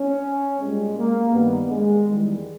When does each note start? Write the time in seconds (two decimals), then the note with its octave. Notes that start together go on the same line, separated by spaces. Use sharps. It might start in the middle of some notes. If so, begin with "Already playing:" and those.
Already playing: C#4
0.59 A#2 G3 G#3
0.96 A#3
1.32 G2 D#3 G3 B3
1.69 G#3
2.07 E2 D#3 G3